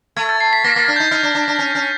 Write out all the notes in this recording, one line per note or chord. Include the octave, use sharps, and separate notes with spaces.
A3 G#6
A6
C7
B6
A#3 A#6
A#3 A6
D4
D#4 G6
D#4 F6
D4
D4
D4
C#4
C#4